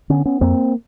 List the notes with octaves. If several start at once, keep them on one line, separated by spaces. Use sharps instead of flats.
D3 B3 C#4
B3 C#4
F2 A#3 C4